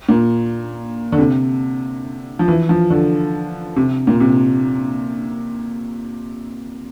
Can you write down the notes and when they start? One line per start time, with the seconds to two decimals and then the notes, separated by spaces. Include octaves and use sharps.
0.09 A#2
1.12 D3
1.18 C3
2.39 F3
2.48 E3
2.69 F3
2.90 D3
3.76 C3
4.07 A#2
4.20 C3